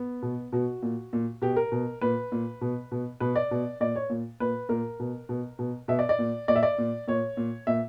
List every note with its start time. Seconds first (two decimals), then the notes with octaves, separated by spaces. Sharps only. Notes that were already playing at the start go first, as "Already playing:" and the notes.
Already playing: B3
0.22 B2
0.52 B2 F#4
0.82 A#2
1.13 A#2
1.42 B2 G4
1.56 A#4
1.72 B2
2.01 A#2 B4
2.32 A#2
2.61 B2
2.92 B2
3.20 B2 B4
3.36 D5
3.51 B2
3.81 A#2 D5
3.96 C#5
4.10 A#2
4.40 A#2 B4
4.69 A#2 A#4
5.00 B2
5.29 B2
5.59 B2
5.88 B2 E5
5.99 D5
6.09 D5
6.19 A#2
6.48 A#2 D5
6.56 E5
6.63 D5
6.78 A#2
7.08 A#2 C#5
7.37 A#2
7.67 A#2 E5